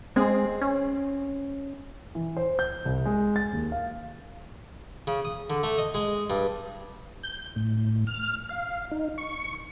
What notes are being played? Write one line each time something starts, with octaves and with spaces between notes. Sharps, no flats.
G#3 C4 G#4
C#4
E3
C5
G6
C2
G#3
A6
D#2
F5
C#3
D#6
D3
A3
D#5
G#3
G2
G6
A2
F6
F5
D#4
C#6